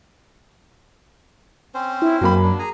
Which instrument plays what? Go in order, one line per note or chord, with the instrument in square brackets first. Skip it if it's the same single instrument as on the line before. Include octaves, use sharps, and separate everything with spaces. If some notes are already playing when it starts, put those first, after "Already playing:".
[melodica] C4 C#4 C5
[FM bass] E4
[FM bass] F#2 [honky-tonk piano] F#3 A#3 B5
[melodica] D4
G#4 G#5 A#5